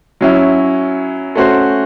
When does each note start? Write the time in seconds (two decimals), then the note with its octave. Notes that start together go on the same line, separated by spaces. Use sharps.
0.21 F#3 C#4 E4
1.35 A3 C#4 F#4 C5